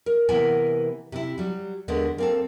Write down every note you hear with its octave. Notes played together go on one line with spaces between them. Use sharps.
A#4
C3 E3 A#3 B3 G#5
C3 E4
F#3 G3
D#2 D3 G#3 B3
A#3 C4 A4